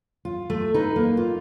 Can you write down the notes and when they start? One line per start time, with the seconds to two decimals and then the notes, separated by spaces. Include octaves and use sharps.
0.25 F4
0.50 A3
0.74 D#4 B4
0.96 A#3
1.17 F4